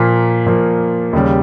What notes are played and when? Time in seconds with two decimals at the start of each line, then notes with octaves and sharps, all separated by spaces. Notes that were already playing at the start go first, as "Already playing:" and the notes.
Already playing: A#2 F3 A#3
0.46 A#2 F3 A#3
1.13 D#2 C#3 G3